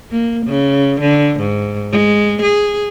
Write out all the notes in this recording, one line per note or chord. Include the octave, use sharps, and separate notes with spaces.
A#3
C#3
D3
G#2
G#3
G#4